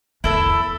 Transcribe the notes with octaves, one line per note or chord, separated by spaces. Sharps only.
E2 E4 A4 E5